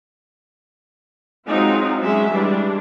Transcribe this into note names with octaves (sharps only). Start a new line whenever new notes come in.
F#3 G#3 C4 D#4 F4
F#3 G#3 C#4 E5
E3 G3 G#3 D4